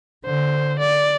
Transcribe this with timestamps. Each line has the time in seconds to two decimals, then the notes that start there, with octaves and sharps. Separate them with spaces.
0.25 D3 C5
0.79 D5